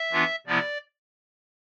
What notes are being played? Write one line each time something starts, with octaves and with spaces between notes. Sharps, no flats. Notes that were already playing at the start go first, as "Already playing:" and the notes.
Already playing: E5
E3 B3 D4 F4
C3 F3 B3 E4 D5